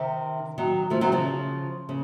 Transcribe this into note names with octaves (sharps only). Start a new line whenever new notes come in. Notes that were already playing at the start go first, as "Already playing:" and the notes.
Already playing: C3 D#3
D#3 F#3
F3 A3
D#3 F#3
C#3 F3
C#3